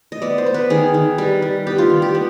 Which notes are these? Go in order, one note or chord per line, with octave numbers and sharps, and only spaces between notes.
D#5
B3 D5
C5
B3
B4
D#3 G#4
D#3
G3 B4
G3
B3 G4
F4
D#3
G4
B3